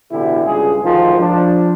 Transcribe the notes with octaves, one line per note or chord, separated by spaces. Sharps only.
A1 B2 D3 E3 E4 G4
C#2 G2 C#3 G#3 G#4
D2 G#2 D#3 F3 F4 C5
F3 D4